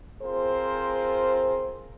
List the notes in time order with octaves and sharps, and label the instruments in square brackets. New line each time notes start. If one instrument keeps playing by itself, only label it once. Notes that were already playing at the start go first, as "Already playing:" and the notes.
[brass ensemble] C4 F4 G#4 A#4 C5